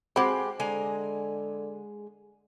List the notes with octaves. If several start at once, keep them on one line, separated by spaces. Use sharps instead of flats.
G#3 C4 F#4 G4 C5 B5 D6
D3 G#3 G#5 A#5